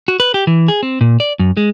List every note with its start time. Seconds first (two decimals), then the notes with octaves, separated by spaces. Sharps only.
0.08 F#4
0.20 B4
0.34 G4
0.47 E3
0.68 G#4
0.83 C4
1.01 A#2
1.20 D5
1.39 F#2
1.57 G#3